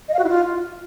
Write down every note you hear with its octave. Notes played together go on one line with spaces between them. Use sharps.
D#5
F5
F#4
E4
F4